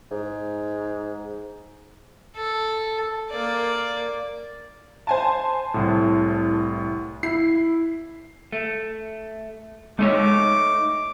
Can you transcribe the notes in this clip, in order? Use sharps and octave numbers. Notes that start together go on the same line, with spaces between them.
G#2
A4
A#3 D5
C5 G#5 A5
C2 A2
E4 C7
A3
G#3 A3 D#4 C#5 D6